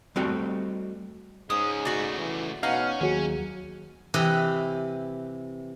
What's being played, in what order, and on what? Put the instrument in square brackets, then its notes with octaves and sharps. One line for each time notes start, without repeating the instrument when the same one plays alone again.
[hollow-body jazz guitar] G3 A3 C4 D#4 F#4 G5
[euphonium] G#2 [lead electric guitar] G#3 C#4 [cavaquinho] D#6
[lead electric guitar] C#3 A3 [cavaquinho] F#4 D5
[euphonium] E3
[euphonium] B2 [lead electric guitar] C#4 [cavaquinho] D#4 F#5 [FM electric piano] F5
[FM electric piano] D#2 F#3 [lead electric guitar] C#4 [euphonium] G#4
[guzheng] C3 E3 G4 B4 D#5